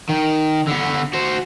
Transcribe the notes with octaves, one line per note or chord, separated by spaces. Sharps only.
D#3
D3 B3
F#4 C5